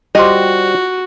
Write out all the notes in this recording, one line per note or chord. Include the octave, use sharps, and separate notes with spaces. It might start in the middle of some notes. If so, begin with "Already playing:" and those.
G3 F4 F#4 C5 D#5